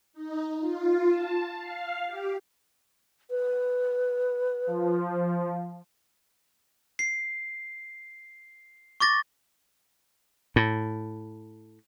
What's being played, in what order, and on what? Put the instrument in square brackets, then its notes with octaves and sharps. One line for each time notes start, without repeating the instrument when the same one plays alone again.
[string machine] D#4
F4
A5
F5
G4
[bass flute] B4
[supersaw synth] F3
[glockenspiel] C7
C#6 D6 A6 A#6
[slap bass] A2